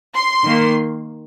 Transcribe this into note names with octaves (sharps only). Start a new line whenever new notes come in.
C6
D#3 A#3